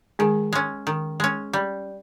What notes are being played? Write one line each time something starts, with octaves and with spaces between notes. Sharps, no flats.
D#3 G#3 G#4
G#3 C#4
D#3
G#3 C#4
G3